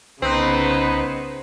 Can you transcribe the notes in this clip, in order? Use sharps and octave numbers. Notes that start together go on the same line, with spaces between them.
C2 C#3 B3 C4 D#4 B4 C5